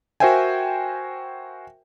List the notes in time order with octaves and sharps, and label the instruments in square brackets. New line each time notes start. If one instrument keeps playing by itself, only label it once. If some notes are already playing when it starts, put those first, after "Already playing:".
[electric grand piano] F#4 A#4 C5 E5 G5 G#5